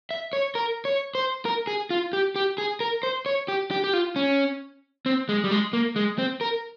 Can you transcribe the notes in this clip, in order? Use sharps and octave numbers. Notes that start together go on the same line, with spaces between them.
E5
C#5
A#4
C#5
C5
A#4
G#4
F4
G4
G4
G#4
A#4
C5
C#5
G4
G4
G4
F4
C#4
C4
G#3
G3
G#3
A#3
G#3
C4
A#4